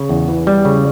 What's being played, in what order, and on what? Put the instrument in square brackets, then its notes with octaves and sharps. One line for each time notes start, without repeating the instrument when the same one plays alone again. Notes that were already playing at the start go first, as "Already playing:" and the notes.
Already playing: [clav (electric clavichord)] C#3
E2
E3
G3
C#3